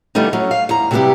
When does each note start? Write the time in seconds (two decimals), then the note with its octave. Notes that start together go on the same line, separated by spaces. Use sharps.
0.15 D3 E3 G3 A3 B3 D#4
0.33 F#3 C#4
0.51 F5
0.69 E2 A#5
0.91 C3 F#3 G3 B3 E4 G4